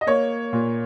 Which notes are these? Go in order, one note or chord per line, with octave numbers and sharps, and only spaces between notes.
D#5
A#3 C#5
A#2